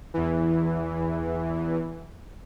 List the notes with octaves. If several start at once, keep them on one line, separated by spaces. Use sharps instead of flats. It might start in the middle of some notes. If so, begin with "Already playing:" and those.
E2 E3